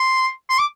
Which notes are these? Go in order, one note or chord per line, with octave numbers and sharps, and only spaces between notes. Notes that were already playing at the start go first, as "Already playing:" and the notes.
Already playing: C6
C6
D6